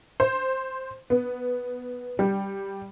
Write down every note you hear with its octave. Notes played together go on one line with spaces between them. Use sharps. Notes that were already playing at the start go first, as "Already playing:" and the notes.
C5
B3
G3